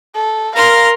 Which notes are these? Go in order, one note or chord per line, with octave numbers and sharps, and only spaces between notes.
A4
A#4 F5 A#5 C6 F6